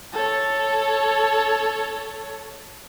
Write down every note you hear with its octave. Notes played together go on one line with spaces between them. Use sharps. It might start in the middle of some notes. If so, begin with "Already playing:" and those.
A4 C#5